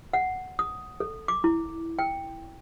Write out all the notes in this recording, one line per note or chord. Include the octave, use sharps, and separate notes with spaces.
F#5
D#6
A4
D6
E4
G5